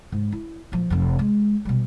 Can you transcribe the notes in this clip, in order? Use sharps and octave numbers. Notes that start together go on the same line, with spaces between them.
G#2
E4
A#2 F3
F1 F2
G#3
B2 G3